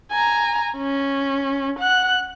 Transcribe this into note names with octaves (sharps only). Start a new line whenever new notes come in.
G#5 A#5
C#4
F#5 F#6